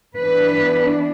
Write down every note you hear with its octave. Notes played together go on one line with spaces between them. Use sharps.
E3 B3 D4 B4